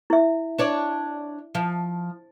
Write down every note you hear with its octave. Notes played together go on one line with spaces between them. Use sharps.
E4 E5
D4 C#5 D5
F3